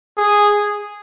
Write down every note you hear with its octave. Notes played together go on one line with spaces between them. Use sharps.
G#4